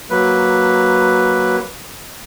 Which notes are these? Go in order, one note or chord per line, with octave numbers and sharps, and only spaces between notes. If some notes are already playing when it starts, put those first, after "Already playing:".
F#3 A#3 B4